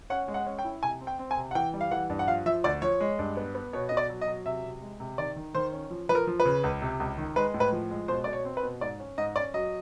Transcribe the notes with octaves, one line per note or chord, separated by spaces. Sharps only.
C#4 F#5
G#3
F#5
C#4
G5
E4
C3 G#5
C4
G5
C4
G#5
C3
F#5
E3 G5
G3
F5
E3 F#5
G2
F#5
F3 F5
F3 E5
D2 D5
F3 C#5
G#3
G2
B3
B3
B2 C#5
B2 D#5
D5
F#3
D#5
F#3
C3 E5
C3
G#3
C3
D#3 D5
D#3
D#3 C5
C#4
F3
F3 B4
A#4
F3
B4
C#3
C#2
C3
C#2
D#3
G#3 B4
A2
B4
F3
G#3
B2 C5
B2 D5
C#5
C4
B4
B2
G#2 D5
C#4
G#2 D#5
C#4 D5
F#3 D#5